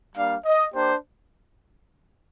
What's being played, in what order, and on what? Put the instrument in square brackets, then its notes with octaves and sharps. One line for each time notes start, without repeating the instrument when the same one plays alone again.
[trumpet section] G3 A#3 D4 F5
D#5
A#3 D4 G4 C5